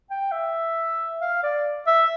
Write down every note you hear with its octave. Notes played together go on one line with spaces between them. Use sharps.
G5
E5
F5
D5
E5